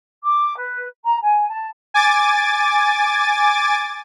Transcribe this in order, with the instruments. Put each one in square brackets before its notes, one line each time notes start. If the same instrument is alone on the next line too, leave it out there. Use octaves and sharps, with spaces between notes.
[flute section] D6
B4
A#5
G#5
A5
[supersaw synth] G#5 D6 A6